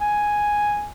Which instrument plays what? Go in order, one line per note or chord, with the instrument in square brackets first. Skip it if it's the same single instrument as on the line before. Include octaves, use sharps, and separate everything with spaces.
[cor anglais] G#5